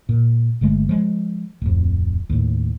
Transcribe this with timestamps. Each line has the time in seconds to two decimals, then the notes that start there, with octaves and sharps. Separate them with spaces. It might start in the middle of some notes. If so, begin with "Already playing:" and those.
0.09 A#2
0.61 G1 D3 G#3 A3
0.89 F3 G#3
1.62 D1 F2
2.30 D#2 A2